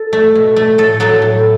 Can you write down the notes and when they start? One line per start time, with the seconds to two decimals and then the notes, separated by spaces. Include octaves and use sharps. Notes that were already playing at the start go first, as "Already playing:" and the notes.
Already playing: A4
0.13 A3
0.35 B2
0.56 A3
0.78 A2 A4
1.00 F#3 A3 A4
1.22 A2